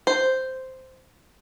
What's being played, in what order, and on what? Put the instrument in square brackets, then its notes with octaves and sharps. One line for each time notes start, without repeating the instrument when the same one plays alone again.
[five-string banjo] C5